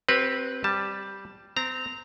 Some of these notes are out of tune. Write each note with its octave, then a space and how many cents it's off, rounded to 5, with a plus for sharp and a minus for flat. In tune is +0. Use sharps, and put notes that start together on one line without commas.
C4 +10 G4 -35 B4 -15
G3 +0 A5 +5
C4 -20 A#5 -10